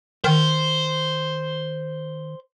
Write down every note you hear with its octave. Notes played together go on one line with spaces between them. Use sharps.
D#3 C5